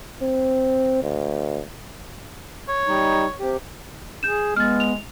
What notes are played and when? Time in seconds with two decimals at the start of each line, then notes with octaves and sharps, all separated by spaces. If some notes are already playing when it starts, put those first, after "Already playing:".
0.22 C4
1.03 D2
2.69 C#5
2.88 G3 D#4
3.40 C3 G4
4.23 G#4 G6 E7
4.56 G#3 B3 F6 A6
4.80 F7